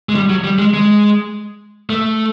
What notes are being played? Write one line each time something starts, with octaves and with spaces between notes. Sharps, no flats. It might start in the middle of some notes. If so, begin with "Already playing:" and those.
G#3
G3
F#3
G3
G#3
G#3
A3